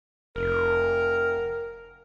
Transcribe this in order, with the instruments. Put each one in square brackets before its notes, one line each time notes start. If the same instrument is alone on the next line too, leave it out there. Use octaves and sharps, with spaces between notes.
[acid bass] F1 [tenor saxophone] A#4